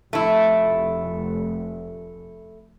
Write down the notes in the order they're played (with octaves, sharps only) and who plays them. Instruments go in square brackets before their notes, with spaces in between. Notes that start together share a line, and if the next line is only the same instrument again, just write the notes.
[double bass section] F1 [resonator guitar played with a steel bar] A3 E4